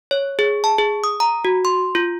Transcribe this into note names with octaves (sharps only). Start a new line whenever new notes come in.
C#5
G#4
A5
G#4
D#6
A#5
F#4
C6
F4